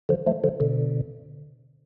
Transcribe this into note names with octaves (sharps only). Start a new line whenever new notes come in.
D3 F3
F3 A3
D3 F3
B2 D3